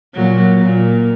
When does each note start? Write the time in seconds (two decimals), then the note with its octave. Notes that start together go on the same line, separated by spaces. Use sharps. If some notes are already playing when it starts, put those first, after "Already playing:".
0.15 A#2 F#3
0.60 A#2